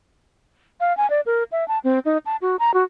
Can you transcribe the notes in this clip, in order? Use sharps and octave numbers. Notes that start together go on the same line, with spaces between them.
F5
G#5
D5
A#4
E5
A5
C4
D#4
A5
F#4
A#5
F#4